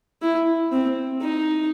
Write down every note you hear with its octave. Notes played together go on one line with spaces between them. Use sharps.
E4
C4
D#4